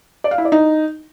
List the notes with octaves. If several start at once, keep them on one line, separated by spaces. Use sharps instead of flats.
D5
F5
E4
D5
D#4